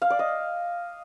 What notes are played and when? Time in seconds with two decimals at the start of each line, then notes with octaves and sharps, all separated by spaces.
0.02 F5
0.10 D5
0.19 D#5